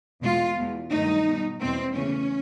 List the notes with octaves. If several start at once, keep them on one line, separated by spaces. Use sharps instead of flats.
E2 B2 G#3 F4
E2 B2 G#3
G2 D#3 F#3 A3 D#4
B2 G3
E2 B2 G#3 C4
E2 C#3 E3 A3 C#4